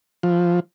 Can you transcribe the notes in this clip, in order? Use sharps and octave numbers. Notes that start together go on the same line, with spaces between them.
F3